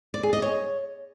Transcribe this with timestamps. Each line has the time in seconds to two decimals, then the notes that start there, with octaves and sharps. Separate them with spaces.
0.14 D5
0.23 G#4
0.33 D#5
0.42 C#5